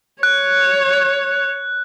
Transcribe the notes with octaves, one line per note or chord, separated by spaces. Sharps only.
C#5 F#6